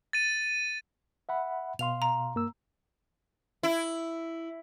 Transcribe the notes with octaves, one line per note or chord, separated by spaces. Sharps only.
A6 D#7
E5 F#5 B5
B2 F5 C6 F7
A#5
G2 A#3 E6
E4